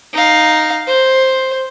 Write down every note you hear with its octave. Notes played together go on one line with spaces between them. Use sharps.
D#4 F5
C5